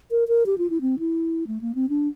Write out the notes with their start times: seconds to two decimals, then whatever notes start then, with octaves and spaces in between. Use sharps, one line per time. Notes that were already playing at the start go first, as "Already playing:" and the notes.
0.11 A#4
0.28 A#4
0.46 G4
0.58 F4
0.70 E4
0.81 C4
0.99 E4
1.47 A3
1.61 A#3
1.75 C4
1.89 D4